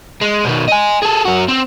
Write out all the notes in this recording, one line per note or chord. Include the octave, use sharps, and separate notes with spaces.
G#3
B2 D#3
D#5 G#5
G#4 A4
F#2 F#4
C4